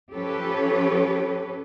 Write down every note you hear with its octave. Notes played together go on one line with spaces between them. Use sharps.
F3 C#4 G4 A4 B4 C#5